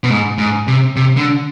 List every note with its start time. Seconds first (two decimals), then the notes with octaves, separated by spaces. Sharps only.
0.04 B2
0.10 G#2
0.38 G#2
0.68 C3
0.96 C3
1.17 D3